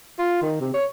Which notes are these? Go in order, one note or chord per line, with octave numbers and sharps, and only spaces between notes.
F4
D#3
C3
C#5